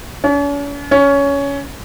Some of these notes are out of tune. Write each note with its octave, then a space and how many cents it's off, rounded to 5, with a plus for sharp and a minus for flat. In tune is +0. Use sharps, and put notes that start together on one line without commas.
C#4 +45
C#4 +15